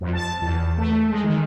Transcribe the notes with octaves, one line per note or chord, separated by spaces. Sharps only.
F2
A5
E2
A3
G#3
D#3